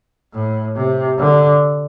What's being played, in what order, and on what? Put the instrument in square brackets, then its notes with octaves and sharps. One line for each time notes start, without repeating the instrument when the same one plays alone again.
[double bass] A2
C3
D3